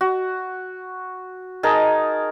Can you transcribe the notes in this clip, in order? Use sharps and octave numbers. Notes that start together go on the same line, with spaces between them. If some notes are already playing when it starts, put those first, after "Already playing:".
F#4
D#4 G#4 A#4 A5